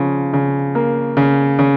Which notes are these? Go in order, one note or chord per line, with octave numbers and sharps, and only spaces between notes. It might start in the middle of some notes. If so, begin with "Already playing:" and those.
Already playing: C#3 F3
C#3
A#3
C#3
C#3